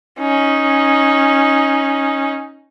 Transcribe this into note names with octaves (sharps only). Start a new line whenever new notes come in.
C#4 D#4